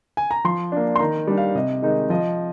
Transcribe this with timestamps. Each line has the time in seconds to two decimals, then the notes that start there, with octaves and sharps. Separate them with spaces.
0.17 G#5
0.31 A#5
0.44 F3 C6
0.72 A#3 D4
0.96 C6
0.99 D#3 A#5
1.27 G3 D4
1.38 F5
1.55 C3 D#5
1.82 D#3 G#3 D#4
2.10 F3 D#5